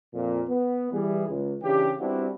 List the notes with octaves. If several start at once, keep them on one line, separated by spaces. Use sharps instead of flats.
F2 A#2
B3
E3 G3 G#4
C#2
C#3 E3 D4 G4
G3 B3 C4 D4 E4 F#4